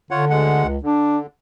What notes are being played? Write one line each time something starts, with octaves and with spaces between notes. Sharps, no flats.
D3 F4 C#5 F#5
D2 G#3 F#5
C#2
D3 D4